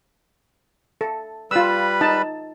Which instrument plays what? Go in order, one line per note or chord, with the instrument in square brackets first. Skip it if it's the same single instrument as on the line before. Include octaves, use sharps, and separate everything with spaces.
[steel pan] A4
[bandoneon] G3 B4 B5 [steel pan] F4 E6
[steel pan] D#4 A5